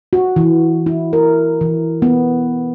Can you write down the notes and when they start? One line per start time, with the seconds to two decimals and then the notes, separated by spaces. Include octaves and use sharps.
0.13 F#4
0.36 E3
0.86 E4
1.13 A#4
1.61 E3
2.02 B3